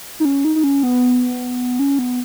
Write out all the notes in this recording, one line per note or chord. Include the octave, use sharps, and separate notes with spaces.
D#4
C#4
D#4
D#4
C#4
B3
C#4
B3